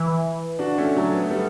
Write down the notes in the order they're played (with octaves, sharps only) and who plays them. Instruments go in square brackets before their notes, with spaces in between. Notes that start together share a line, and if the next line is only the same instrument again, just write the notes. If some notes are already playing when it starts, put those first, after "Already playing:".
Already playing: [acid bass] E3
[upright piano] D4 F#4
A3 C#4
F#3 A3
B3
A3
G3 B3